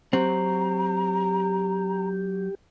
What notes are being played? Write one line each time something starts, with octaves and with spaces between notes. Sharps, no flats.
F#3 C4 G4 F#5 A#5